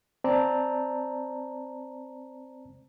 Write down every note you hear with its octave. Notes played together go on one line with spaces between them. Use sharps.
C4 C5 D5 A5 A#5